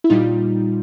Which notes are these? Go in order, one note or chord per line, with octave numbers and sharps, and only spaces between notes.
E4
A#2 G3 D#4 F4